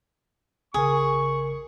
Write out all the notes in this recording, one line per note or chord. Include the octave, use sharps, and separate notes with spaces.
A1 C#3 G#4 A#4 C#6